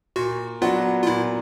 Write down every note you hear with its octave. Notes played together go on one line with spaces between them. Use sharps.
A#2 F#4
F#3 B3 D4 F4 F#4
F4
A#2 E4